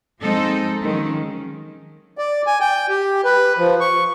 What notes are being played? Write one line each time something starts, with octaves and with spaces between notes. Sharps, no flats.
F3 G#3 C4 D#4 A4
D#3 F3 F#3 G#3 C#4
D5
G#5
G5
G4
B4
F3
C#6